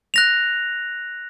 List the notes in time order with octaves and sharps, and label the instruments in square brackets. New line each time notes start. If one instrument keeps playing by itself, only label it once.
[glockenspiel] F#6 A#6 F7